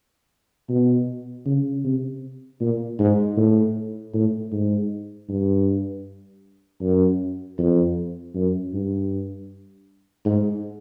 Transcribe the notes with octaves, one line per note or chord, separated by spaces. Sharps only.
B2
C#3
C3
A#2
G#2
A2
A2
G#2
G2
F#2
F2
F#2
G2
G#2